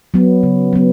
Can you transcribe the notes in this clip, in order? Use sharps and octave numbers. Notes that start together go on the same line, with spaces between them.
F#3 B3
C#3
F#3 B3